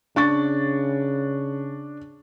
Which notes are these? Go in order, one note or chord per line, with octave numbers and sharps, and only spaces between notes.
C#3 D4 C#6 A6